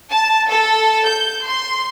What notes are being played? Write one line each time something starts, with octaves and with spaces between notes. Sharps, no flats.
A5
A4
G6
C6